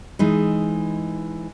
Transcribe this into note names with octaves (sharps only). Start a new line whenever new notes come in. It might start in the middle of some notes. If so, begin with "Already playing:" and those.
E3 G#3 D#4